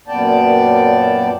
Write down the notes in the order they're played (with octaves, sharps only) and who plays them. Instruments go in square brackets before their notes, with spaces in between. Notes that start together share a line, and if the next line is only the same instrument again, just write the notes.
[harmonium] F#2 A#2 B3 D5 G5 A5